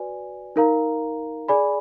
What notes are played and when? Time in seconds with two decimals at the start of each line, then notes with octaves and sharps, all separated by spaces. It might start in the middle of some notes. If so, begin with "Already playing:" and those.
Already playing: F#4 B4 D5 G#5
0.56 D#4 A#4 F5 A#5
1.48 G#4 D5 G#5 B5